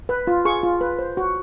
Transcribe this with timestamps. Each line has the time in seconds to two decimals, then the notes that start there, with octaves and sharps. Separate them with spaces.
0.09 B4
0.27 F4
0.45 G#4 C#6
0.63 F4
0.81 B4
0.99 C5
1.17 F#4